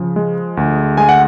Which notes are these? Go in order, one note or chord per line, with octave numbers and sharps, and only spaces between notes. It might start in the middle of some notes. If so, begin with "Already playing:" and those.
Already playing: C#3 F3
G#3
D2
G#3 G#5
F#5